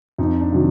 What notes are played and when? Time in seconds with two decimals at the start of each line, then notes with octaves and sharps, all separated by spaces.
0.18 F2 D#4
0.41 D4
0.52 C3 D#3 F#3